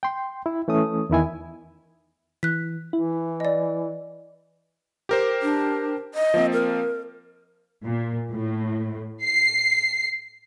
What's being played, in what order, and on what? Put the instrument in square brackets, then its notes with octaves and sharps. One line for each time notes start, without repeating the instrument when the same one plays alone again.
[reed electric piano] G5 C6
E4
E3 A3 C#4 D#6
E2 D#3 E4 G#5
[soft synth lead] E3 [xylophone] F#6 B6
[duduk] E3 [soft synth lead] E4
[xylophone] D5 D#5
[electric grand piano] G4 A#4 C5
[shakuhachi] D4
D#5
[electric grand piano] F3 A#3 C4
[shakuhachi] A#4
[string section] A#2
A2
C7